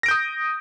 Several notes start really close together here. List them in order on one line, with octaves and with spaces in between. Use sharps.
A#6 D7 G6 D#6